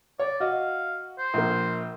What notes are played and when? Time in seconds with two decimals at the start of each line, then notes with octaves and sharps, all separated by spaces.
0.19 C#5 D5
0.40 F#4 D#5 F5
1.18 C5
1.34 A#1 A#3